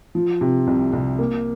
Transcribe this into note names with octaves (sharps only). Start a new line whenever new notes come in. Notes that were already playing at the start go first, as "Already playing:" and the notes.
F3
C3
C2
C2
A#3